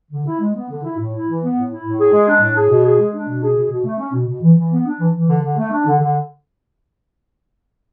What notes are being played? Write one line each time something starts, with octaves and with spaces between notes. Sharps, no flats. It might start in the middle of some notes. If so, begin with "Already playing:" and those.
D3
E4
G#3
B3
D3
E4
A2
E4
E3
B3
A2
E4
A2
G#4
G#3
D4
A2
G#4
B2
G#4
G#3
D4
B2
G#4
B2
B2
A3
C#4
B2
B2
E3
E3
B3
D4
E3
E3
D3
D3
A3
D4
D3
D3